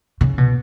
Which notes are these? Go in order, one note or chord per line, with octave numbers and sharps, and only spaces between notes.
C#3
B2